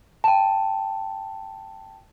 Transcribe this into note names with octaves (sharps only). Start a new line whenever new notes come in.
G5 A5